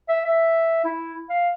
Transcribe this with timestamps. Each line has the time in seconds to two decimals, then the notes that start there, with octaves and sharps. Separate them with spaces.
0.09 E5
0.25 E5
0.85 E4
1.30 F5